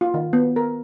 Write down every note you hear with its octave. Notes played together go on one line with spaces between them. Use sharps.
F4
D#3
B3
A#4